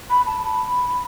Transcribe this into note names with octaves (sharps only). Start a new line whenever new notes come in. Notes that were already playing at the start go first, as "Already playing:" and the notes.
B5
A5
B5